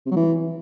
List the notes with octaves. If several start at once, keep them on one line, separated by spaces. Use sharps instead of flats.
C3
F#3
E3